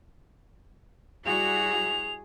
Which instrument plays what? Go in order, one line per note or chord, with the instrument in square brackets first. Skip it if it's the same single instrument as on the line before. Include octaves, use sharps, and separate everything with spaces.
[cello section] G3 E4 F#4 [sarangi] G#4 [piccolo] F7